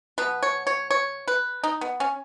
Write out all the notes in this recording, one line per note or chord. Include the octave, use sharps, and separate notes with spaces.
B2 F#3 B3 B4
C#5
C#5
C#5
B4
D#4
B3
C#4